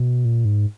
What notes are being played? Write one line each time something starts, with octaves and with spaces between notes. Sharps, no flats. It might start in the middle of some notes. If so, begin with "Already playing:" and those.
Already playing: B2
A#2
G#2